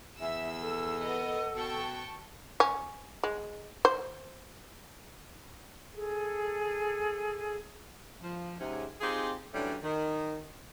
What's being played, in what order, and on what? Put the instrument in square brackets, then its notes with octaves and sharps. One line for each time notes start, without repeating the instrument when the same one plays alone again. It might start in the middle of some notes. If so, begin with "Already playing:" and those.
[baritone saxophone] E2 [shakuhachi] E5 [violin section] E6
[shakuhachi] A4
[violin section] B3 A#4 D#5
[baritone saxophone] B2 [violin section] G5 A5 C#6
[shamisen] C#4
G#3
C5
[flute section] G#4 A4
[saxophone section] F3
G#2 C3 C#4
C4 D#4 F4 G4 G#4
D3 E3 F#3 G3 A3 C#4
D#3